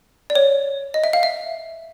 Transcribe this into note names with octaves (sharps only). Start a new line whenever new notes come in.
D5
C#5
D#5
E5
F5
E5